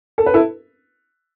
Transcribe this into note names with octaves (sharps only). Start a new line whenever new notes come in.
A4
B4
E4 A4